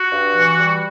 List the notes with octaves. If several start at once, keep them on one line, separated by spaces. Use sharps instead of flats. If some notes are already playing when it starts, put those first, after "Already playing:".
Already playing: F#4
G2
E3
G3